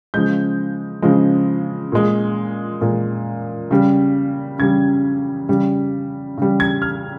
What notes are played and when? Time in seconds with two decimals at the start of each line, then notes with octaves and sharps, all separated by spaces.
0.14 C#3 F3 G#3 G6
1.02 C#3 F3 G#3
1.92 A#2 G#3
2.81 A#2 G#3
3.71 C#3 G3
4.59 C#3 G3 G#6
5.49 C#3 G3
6.38 C#3 G3
6.60 G#6
6.82 F6